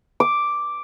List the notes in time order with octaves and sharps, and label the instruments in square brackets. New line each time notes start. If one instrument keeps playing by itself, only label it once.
[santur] D6